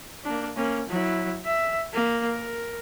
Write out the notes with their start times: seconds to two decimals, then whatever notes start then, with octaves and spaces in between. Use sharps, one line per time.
0.25 A#3 D4
0.56 A#3 C#4
0.89 F#3 E4
1.45 E5
1.94 A#3
2.27 A#4